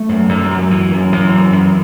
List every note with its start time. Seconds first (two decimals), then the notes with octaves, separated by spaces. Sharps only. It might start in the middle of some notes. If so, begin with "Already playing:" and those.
Already playing: A3
0.09 F#2
0.29 F#2
0.44 G3
0.51 F#2 F#3
0.71 F#2 E3
0.91 F#2
1.12 F#2 E3
1.33 F#2
1.53 F#2